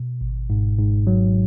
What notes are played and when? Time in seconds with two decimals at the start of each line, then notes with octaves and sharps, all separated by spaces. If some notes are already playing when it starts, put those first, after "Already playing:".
Already playing: B2
0.21 G#1
0.50 G#2
0.79 G#2
1.07 F#3